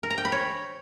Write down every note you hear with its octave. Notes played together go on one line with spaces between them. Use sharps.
A#4
A#5
G5
B5
C#5